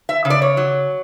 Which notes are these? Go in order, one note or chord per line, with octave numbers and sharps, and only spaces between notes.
E5
C#3
D5
C#5
F#3